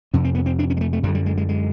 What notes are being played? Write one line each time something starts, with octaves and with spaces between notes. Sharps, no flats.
F2 C3 C#4
C4
B3
C4
D4
C#4
G#3
A3
A3
F#2 D3 G3
G3
G#3
G#3
G#3